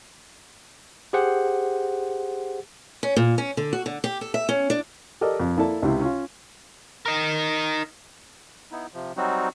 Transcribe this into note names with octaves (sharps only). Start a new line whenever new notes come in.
G4 G#4 C5 F#5
C#4
A#2
C#4
D3
F#4
D3
G4
A4
E5
C#4
D4
G4 A4 A#4 D5 D#5
F2
A#3 E4 A4 D5 A5
C#2 C3 E4
C#4 F4
D#4 A#4
B3 D#4 E4
C3 F3
F#3 G3 C4 D#4 F#4